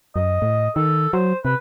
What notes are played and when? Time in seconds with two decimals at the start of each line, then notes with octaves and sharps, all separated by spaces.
0.16 F#2 D#5
0.42 A2
0.76 D#3 A4
1.13 F#3 C5
1.45 C3 B4